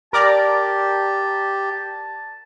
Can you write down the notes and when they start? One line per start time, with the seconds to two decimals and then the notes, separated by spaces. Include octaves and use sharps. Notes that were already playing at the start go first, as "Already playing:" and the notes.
0.13 G4 A#4 D5 A5 A#5